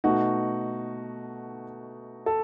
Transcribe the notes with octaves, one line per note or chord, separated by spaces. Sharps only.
B2 A3 D#4 F#4
A4